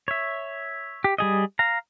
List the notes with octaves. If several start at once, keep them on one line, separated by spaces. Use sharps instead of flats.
C#5 E5
G4
G3 G#4 D#5
F5 A#5